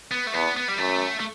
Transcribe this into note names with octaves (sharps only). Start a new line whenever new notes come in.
B3
A3
E2 B3
B3
G3
F#2 A3
A3